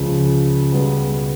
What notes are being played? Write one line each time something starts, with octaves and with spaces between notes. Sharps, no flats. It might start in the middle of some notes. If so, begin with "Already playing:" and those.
Already playing: C#2 C#3 F3
C#2 B2 G3 B3